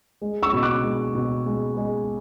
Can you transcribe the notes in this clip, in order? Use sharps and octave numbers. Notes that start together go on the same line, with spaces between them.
G#3
C#6 E6
B2
D6 F#6
G#3
B2
G#3
G#3